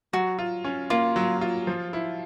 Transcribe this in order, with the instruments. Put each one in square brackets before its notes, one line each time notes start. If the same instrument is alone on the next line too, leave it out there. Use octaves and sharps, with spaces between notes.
[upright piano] F#3 [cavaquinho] F#4
[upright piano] F4
C#4
[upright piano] A#3 [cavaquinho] F4
[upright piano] F#3
F4
F3
E4